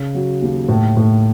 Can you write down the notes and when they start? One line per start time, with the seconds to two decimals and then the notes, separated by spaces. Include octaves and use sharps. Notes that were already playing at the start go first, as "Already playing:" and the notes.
Already playing: C#3
0.15 F#3
0.42 D#2
0.68 A2
0.97 A2